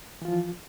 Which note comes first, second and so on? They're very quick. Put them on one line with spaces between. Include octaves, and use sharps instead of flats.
E3 F4 F3